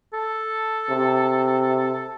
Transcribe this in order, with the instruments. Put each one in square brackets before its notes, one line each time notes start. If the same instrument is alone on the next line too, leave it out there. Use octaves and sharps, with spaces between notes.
[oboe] A4
[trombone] C3